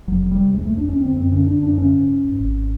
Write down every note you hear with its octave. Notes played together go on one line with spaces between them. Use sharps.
F1 F#3
C3
G3
C3
E2 G#3
E2 A3
D4
E2 C#4
D3 C4
F#2 C4
D3 C#4
D3 D4
F#2 D4
D3 C#4
G#2
G#2
G#2
G#1